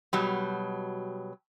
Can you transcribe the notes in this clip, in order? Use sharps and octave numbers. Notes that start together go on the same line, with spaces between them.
B2 F#3 G3